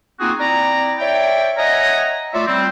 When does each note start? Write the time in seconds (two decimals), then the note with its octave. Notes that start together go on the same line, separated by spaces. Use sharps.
0.20 A#3 C4 D#4 F4 F#4 G#4
0.40 C4 E4 D5 A#5
0.99 C#5 D5 E5 G5
1.58 C#5 D#5 E5 F#5 G#5 A#5
2.34 A3 F4 C#5 D5 E5
2.46 G3 C4